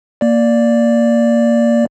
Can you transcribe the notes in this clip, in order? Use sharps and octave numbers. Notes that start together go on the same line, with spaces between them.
A#3 D5